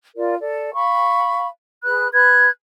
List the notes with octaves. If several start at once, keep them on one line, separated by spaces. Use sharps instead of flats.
F4 A#4 D5
A4 D5
F5 B5 C#6
G#4 B4 B5 F#6
B4 F#6 G#6